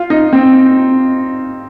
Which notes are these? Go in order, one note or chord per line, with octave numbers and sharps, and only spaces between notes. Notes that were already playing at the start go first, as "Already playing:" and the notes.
Already playing: F4
D#4
C4